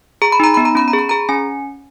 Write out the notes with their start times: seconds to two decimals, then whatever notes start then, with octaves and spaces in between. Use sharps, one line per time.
0.22 G#4 A#5
0.32 B5
0.40 D#4 A#5
0.54 B3 B5
0.65 A#5
0.75 C#4 B5
0.88 A#5
0.93 G#4
0.99 B5
1.09 G#4 A#5
1.29 C#4 G#5